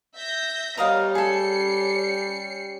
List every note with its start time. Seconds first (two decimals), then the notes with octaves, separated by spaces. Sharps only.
0.14 E5 G6 A#6
0.77 G3 B3 A#4 C#5 D#5 F5
1.15 C#4 G#4 A4 C7 C#7